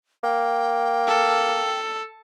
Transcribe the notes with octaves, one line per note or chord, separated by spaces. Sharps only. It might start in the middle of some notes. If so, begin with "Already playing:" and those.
A#3 G5
A4